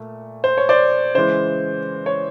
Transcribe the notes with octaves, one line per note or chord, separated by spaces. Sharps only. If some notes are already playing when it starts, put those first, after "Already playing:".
Already playing: A#2 A3
C5
C#5
C5 D5
C#3 E3 G#3 C5
C#5